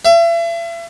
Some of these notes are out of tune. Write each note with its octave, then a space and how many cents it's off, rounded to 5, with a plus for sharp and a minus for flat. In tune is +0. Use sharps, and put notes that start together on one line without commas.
E5 +40